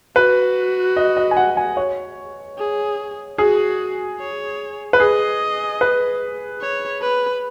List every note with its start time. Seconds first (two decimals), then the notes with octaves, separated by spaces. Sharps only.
0.16 F#4 B4
0.97 D#5
1.17 D#5
1.31 G#5
1.37 F#5
1.57 G#5
1.77 C#5
2.58 G#4
3.38 F#4 G#4
4.20 C#5
4.93 B4
5.00 G#4 D#5
5.81 B4
6.61 C#5
7.02 B4